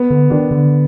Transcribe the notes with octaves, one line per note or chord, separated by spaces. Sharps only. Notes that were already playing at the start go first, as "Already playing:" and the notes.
Already playing: B3
D3
D#3 D4
D3